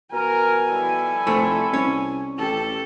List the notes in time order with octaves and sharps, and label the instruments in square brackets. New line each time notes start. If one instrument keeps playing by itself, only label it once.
[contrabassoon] B2 [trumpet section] A#4 [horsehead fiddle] G#5
[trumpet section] G3 E4 A4
[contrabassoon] F1 [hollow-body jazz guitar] A3 C4
[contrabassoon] C2 [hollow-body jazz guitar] C#4
[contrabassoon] A1 [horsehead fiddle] G4 A4